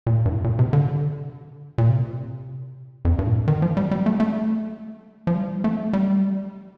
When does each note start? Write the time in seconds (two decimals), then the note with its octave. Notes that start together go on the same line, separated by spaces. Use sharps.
0.06 A#2
0.15 A2
0.25 G2
0.30 A2
0.44 A#2
0.59 C3
0.73 D3
1.78 A#2
1.89 C3
3.05 F2
3.19 G2
3.27 A#2
3.33 A2
3.48 D#3
3.62 F3
3.77 G3
3.91 G3
4.06 A3
4.20 A3
5.27 F3
5.35 G3
5.64 A3
5.93 G3